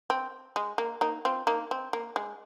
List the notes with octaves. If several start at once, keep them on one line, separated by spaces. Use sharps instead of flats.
C4
G#3
A#3
A#3 D#4
C4 F4
A#3 D#4
C4
A#3
G#3